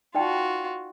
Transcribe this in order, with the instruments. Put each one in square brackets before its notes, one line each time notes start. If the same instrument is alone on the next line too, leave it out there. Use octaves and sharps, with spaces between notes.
[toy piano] D#4 D5 G5 [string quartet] F4 F#4